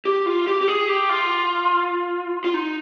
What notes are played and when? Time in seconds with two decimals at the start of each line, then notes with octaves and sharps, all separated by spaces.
0.05 G4
0.26 F4
0.47 G4
0.61 G4
0.68 G#4
0.88 G4
1.09 F4
2.44 F4
2.54 D#4